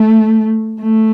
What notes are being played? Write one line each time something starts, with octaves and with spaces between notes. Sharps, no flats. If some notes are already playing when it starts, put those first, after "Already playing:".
Already playing: A3
A3